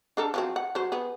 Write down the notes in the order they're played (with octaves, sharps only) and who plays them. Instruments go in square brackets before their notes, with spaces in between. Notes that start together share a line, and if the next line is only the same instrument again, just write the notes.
[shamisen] D4 A4 A#4
F3 F#3 C4
F#5
F#3 C5
B3 G#4